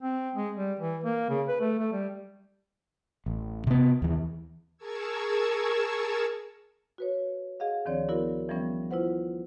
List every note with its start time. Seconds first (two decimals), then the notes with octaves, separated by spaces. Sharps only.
0.02 C4
0.36 G#3
0.55 G3
0.80 E3
1.04 A#3
1.29 C#3
1.48 B4
1.61 A3
1.79 A3
1.93 G3
3.26 A1
3.67 C3 B3
4.02 D#2 E3
4.77 G#4 A#4 A5 C#6 E6 G#6
6.98 F#4 B4 C#5
7.60 G#4 D#5 F5 F#5
7.85 D2 D#3 F3 C4 C#5 D5
8.09 B3 E4 F#4 A#4
8.49 E3 F3 G3 B3 C#4
8.91 E4 F4 B4 C5 F#5